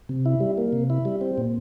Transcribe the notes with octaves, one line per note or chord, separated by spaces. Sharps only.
C3
E4
G3
A#3
C3
E4
G3
C4
A#2